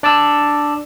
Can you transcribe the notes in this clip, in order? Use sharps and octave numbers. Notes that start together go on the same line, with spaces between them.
D4 D5 A5 E6